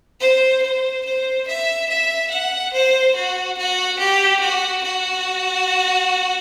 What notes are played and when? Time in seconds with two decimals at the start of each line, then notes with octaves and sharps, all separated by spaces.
0.20 C5
0.62 C5
1.05 C5
1.47 E5
1.89 E5
2.31 F#5
2.73 C5
3.15 F#4
3.57 F#4
3.99 G4
4.40 F#4
4.83 F#4